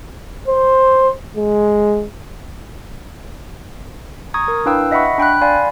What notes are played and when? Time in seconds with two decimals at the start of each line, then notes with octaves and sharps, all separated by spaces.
0.48 C5
1.37 G#3
4.34 A#5 C#6 D#6 G#6
4.48 A#4
4.66 D4 E4 B4 F5 G5 E6
4.91 D#5 E5 F#5 B5 C#6
5.18 D4 G5 B5 F#6
5.41 D5 F5 G#5 B5 C6